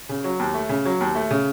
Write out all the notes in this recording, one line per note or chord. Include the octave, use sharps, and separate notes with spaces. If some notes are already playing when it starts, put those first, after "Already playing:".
C#3
F#3
D#2
A3
C#3
F#3
D#2
A3
C#3